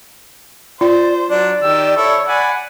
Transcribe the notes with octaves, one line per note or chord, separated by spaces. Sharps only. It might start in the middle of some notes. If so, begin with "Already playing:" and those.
F4 C5 D5
F#3 D4 D5
D#3 G4 E6
E4 A4 C#5
D5 F#5 G#5 B5